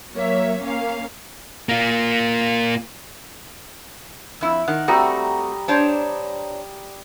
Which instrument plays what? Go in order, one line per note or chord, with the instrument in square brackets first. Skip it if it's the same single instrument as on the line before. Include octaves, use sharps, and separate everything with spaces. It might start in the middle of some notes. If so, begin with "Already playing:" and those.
[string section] F#3 A#3 C#5 E5
A#3 C#4 F5
[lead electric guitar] A#3 F4
[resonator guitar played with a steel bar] F2 E4
[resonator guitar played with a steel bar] D#3 [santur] F#5
[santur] G3 A#5 D#6 [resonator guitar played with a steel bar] A3 C4 F#4
[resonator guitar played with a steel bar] D4 C5 C#5